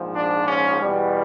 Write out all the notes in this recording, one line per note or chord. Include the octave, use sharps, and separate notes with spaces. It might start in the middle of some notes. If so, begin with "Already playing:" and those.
Already playing: A#1 G#2 F3
D4
C#4
E2 B2 G3